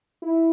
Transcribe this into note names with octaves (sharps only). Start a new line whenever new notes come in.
E4